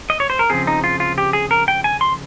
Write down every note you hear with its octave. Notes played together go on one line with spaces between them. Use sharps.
D#5
C#5
C5
A#4
C#3 F3 C4 G#4
D#4
F4
F4
G4
G#4
A#4
G5
G#5
C6